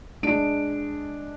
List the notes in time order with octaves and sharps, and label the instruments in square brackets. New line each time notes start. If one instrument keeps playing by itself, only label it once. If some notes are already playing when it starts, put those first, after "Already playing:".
[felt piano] G#3 D4 D7